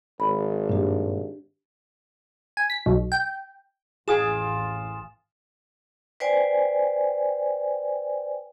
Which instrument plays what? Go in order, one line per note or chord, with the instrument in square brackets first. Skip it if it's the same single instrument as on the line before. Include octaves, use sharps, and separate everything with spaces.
[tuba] G#1 [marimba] B5
[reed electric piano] G2 A#2 [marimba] D4 G4
[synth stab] G#5
B6
B1
G5
[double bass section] A1 F2 [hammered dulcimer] F4 [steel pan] G#4 [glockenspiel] G#5 D#6 E7
[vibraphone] B4 C5 D5 G5 G#5